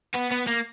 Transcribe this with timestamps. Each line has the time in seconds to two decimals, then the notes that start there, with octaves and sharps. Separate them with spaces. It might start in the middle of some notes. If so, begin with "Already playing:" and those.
0.14 B3
0.31 B3
0.47 A#3